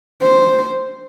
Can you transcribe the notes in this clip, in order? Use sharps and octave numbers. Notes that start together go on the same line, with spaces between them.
C5